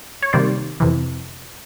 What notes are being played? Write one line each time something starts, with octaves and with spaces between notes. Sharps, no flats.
C#5
C3 D#3 G3 A#3 C5 D5
F2 C3 E3